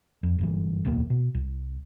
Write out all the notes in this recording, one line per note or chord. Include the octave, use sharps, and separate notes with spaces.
F2
F#1 G2 E3
D1 B1 E2 A#3
B2
C2